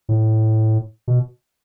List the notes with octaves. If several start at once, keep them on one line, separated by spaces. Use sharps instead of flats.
A2
B2